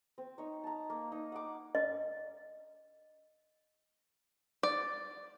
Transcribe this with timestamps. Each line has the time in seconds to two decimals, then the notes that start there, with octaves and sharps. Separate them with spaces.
0.18 C4
0.38 D#4 C#5
0.64 A5 A#5
0.90 A#3
1.12 D#4
1.32 F#5 D6
1.75 D#5
4.63 D5